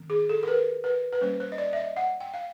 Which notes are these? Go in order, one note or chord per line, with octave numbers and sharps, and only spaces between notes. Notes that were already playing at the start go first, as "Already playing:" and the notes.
Already playing: D#3 C4
G#4
A4
A#4
B4
B4
B4
G3 A#3 C#4 C5
C5
D#5
D5
E5
D#5
F#5
G5
F5